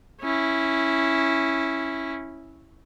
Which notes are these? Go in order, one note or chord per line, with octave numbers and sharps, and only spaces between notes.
C#4 E4